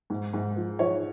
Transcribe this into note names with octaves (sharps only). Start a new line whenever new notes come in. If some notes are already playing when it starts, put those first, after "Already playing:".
G#2
G#2
F3
F3 C#5